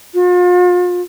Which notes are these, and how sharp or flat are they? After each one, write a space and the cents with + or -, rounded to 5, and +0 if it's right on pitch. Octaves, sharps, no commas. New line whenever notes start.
F4 +40